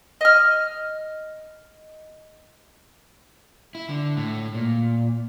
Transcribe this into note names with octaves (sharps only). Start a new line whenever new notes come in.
D#5 F6
E4
D3
A2
A#2